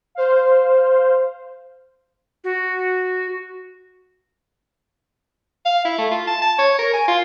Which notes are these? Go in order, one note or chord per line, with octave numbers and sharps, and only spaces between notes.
C5 F5
F#4
F5
E4
A3
F4
A5
A5
C#5
A#4
G#5
F4